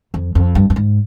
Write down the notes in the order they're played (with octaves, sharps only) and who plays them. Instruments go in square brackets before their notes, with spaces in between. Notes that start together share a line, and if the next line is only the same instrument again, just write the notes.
[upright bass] F2
F2
G2
G2
G#2